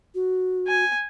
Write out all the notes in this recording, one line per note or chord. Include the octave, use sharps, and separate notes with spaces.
F#4
G#5